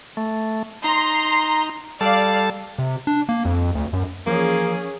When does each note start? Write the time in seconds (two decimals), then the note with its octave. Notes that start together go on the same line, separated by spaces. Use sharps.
0.17 A3
0.84 D#4 A#5 C6
2.01 G3 A4 D5 F5 A5
2.79 C3
3.07 D4
3.29 A#3
3.45 F2
3.75 D2
3.93 F#2
4.27 E3 F3 A#3 C#4 G#4